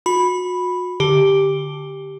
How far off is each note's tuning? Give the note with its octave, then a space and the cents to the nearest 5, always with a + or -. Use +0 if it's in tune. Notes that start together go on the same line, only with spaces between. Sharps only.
F#4 -35 B5 +0
D3 +0 G4 +0